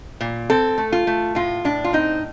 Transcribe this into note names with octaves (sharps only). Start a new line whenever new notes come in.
A#2
C4 A4
A3
F4
A3
A2 F4
A2 D4
F4
C4 D#4